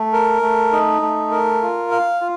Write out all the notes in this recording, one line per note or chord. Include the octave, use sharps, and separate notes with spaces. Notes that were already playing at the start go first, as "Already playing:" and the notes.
Already playing: A3
A#4
A3
D#4
A3
A#4
F4
F5
F4